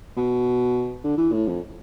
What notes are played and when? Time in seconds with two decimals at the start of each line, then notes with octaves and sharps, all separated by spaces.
0.17 B2
1.04 D3
1.18 E3
1.32 A2
1.48 F2